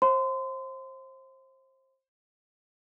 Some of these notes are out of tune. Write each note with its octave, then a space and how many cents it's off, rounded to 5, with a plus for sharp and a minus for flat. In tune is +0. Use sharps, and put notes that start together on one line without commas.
C5 +25 E5 +5 C6 -30